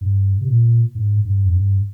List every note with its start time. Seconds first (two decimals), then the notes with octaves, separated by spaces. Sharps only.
0.01 G2
0.41 C3
0.48 A#2
0.95 G#2
1.25 G2
1.45 F2
1.56 G2